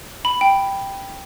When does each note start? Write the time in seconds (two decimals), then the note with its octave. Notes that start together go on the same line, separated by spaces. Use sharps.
0.25 B5
0.41 G5